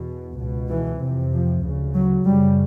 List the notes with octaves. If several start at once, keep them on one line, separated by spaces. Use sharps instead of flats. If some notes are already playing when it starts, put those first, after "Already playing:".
Already playing: E2 B2
C#2 B2
E3
F2 C3
F3
D2 C#3
F#3
F#2 C#3 G3